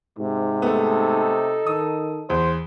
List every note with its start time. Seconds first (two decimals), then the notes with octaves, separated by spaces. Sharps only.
0.18 G#2 C3
0.62 A3 B3 D#4 A4
1.67 D#3 D#6
2.30 E2 C5